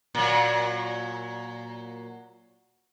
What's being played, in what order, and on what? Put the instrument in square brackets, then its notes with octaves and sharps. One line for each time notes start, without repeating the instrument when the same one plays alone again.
[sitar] A#2 F#3